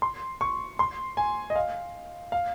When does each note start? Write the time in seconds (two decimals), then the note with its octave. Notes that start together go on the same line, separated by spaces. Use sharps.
0.02 C6
0.41 C#6
0.79 C6
1.17 G#5
1.50 D#5
1.56 F5
2.32 F5